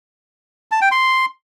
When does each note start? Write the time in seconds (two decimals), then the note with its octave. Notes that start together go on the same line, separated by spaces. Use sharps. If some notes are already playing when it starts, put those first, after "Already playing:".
0.71 A5
0.81 G5
0.91 C6